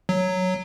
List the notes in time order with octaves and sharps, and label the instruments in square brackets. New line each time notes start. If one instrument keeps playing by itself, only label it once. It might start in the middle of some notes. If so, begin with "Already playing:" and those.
[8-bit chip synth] F#3